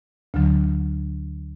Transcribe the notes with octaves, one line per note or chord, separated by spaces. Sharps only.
D2 D3 F#3